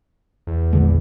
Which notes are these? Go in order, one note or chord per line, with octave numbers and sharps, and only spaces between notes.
E2
A#1 D3 G#3